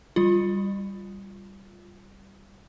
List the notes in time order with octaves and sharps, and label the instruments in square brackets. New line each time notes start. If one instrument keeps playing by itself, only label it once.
[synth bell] G3 F4